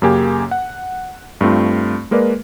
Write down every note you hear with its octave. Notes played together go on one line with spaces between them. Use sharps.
F#2 C#3 A#3 G4 G#5
F#5
G2 A3 C4 F4
G#3 A#3 A#4 B4 D5